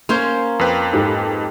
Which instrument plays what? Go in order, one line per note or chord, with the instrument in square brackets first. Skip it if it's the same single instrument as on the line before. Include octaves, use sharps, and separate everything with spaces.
[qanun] A#3 C#4 C5 [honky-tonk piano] C6
[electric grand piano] F2 B4 G5
[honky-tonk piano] G#2 G4 A4